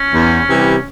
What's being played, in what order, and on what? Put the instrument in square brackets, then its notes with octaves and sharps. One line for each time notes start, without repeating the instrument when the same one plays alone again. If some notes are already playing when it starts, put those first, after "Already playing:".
Already playing: [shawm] C#4
[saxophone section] E2
C3 E3 G3